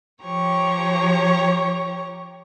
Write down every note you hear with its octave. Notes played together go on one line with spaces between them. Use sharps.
F3 G4 C#5 A#5 C#6